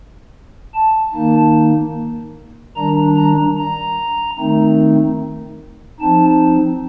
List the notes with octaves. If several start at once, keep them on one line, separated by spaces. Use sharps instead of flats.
A5
D#3 A#3 D#4
D#3 G3 D4 A#5
A#5
A#5
D#3 A3 C4 D#4
F3 C4 D#4 A5